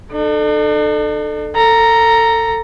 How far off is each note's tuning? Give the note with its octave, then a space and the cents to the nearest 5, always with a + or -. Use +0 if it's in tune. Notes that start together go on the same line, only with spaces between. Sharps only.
D4 +45 A4 +0
A4 +25 A#5 +0